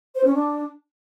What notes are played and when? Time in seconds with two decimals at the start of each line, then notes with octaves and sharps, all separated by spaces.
0.15 C5
0.24 C#4
0.34 D4